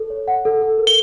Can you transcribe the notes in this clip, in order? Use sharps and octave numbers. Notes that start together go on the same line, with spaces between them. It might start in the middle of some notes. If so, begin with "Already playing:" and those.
Already playing: A4
C#5
F#5
A4
A4
A#4
G7